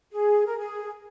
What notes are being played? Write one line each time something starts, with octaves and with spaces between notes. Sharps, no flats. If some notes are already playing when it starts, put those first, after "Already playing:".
G#4
A#4
G#4